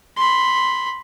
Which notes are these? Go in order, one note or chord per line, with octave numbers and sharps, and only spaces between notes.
B5 C6